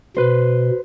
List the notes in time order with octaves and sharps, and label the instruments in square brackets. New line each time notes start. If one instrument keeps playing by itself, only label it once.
[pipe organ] B2 [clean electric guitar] B4 C5